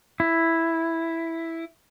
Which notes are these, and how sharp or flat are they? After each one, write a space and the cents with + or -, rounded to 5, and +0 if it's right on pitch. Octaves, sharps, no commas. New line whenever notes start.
E4 +0